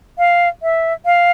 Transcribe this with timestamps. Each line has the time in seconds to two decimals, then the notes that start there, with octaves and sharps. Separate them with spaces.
0.18 F5
0.63 E5
1.05 F5